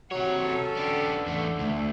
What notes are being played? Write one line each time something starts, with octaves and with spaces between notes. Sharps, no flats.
C3 F#3 C#5 F#5
C#4 A4
D3 B3 G4
E2 A3
D2 A3